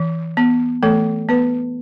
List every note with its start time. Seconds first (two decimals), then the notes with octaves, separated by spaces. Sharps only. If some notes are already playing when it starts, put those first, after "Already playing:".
Already playing: E3
0.37 B3
0.83 E3 A3 A4
1.29 B3 B4